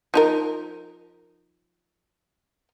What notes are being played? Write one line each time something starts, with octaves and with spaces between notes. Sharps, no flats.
F3 D#4 A#4